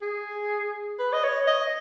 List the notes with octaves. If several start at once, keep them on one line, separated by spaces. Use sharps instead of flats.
G#4
B4
D#5
C#5
D#5